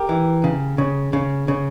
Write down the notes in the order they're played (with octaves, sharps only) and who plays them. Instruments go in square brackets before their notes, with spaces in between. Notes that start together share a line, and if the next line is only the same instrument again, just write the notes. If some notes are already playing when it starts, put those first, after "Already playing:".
Already playing: [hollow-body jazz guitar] G4 A#4
E3
C#3
C#3
C#3
C#3